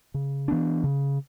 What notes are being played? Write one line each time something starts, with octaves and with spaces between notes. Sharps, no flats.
C#3
E3 B3 D4
C#3